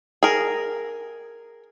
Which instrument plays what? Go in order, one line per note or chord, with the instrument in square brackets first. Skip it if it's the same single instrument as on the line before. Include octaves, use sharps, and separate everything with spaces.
[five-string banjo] G#4 A#4